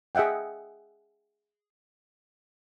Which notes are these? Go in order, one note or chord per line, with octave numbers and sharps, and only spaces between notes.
G#4 D#5 E5 F#5 G5